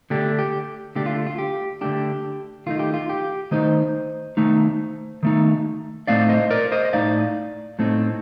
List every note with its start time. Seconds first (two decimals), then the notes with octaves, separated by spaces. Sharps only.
0.10 D3 A3 D4 G4
0.39 G4
0.95 D3 A3 D4 G4
1.06 F4
1.27 F4
1.38 G4
1.81 D3 A3 D4 G4
2.67 D#3 A3 D#4 F4
2.79 G4
2.94 F4
3.09 G4
3.51 D#3 A3 D#4 C5 D#5
4.37 D#3 A3 D#4
5.23 D#3 A3 D#4
6.08 A2 A3 C4 D#4 D5 F5
6.29 C5 D#5
6.50 A#4 D5
6.72 C5 D#5
6.85 D#5
6.93 A2 A3 C4 D#4 D5 F5
7.79 A2 A3 C4 D#4